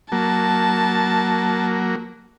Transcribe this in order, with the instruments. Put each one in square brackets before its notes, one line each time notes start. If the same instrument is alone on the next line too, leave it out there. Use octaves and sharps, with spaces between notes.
[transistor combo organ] F#3 A#3 [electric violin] A5